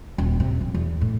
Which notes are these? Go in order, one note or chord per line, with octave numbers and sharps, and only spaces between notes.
D#1
C3
F3
E2
A2